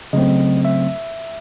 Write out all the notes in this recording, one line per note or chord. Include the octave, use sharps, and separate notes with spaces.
C#3 F#3 A3 C4 D#5
E5